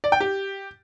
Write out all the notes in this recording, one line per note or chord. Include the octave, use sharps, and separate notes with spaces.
D5
G5
G4